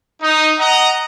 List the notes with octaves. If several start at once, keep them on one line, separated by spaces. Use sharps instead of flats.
D#4
D#5 F#5 A#5